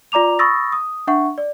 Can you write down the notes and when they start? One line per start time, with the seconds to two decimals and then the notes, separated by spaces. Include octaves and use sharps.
0.12 F4 D5 A#5 D6 F7
0.39 B5 C#6 D#6 E6 A6 A#6
0.72 D#6
1.07 D4 E5 F#5 C#6
1.38 D5